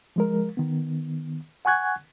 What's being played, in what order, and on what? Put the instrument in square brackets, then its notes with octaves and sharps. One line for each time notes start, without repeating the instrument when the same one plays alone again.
[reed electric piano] F3 G#3 A#4
D#3 B3
F#5 G#5 C#6 F#6 G#6